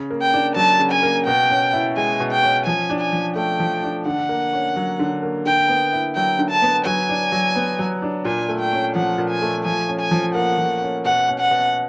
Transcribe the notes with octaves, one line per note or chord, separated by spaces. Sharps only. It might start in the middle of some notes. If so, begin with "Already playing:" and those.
Already playing: C#3
A#3
G5
D4
F#3 A5
C#3
G#5
A#3
B2 G5
C#4
E4
G#3 G#5
B2
G5
C#4
F3 G#5
D4
G#5
F3
A3 G5
F3
D4
D3 F#5
A#3
C#4
F#3
D3
A#3
D3 G5
B3
E4
F#3 G5
D3
A5
B3
F#3 G#5
D4
F#3
B3
F#3
D4
A#2 G#5
A3
G5
C#4
F3 F#5
A#2
G#5
A3
F3 G#5
C#4
G#5
F3
A#3 F#5
F3
C#4
B2 F#5
C#4
F#5
B2